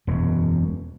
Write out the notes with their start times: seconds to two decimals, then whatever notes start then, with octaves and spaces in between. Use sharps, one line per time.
0.07 E1 F#2